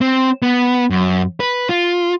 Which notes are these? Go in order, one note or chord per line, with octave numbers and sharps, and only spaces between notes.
C4
B3
F#2
B4
F4